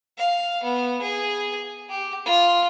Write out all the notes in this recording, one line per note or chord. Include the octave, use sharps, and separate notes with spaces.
F5
B3
G#4
G4
F4